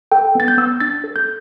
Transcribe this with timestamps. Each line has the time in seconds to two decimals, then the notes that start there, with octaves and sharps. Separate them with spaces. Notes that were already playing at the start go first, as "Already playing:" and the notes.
0.12 A4 G5
0.35 B3 A6
0.48 G6
0.58 B3 E6
0.80 D4 A6
1.04 A4
1.16 G6